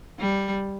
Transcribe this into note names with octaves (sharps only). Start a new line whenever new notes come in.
G3